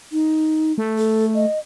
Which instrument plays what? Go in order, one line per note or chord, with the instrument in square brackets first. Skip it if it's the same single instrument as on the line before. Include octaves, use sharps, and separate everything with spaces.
[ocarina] D#4
[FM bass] A3
[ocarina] A4
D#5